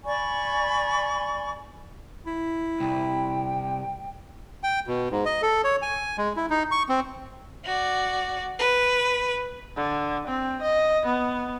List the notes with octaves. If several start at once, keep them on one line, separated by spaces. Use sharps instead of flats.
D5 G#5 B5 C#6
E4
C2 G5
G5
B2
G#2
D#5
A4
C#5
G#5
G#3
E4
D#4
C#6
C4
F#4 D5
B4
D3
C4
D#5
B3